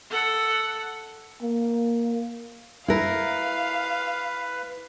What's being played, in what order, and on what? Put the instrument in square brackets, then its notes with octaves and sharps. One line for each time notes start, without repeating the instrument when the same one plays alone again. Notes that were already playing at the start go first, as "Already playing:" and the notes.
[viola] A4 F#5
[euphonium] A#3
[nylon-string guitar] E4 A#4 [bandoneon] B4 [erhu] F5